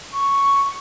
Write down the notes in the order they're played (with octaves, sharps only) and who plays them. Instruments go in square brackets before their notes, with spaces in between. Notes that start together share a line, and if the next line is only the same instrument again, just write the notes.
[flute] C#6